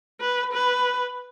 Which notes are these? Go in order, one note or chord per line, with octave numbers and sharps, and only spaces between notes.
B4
B4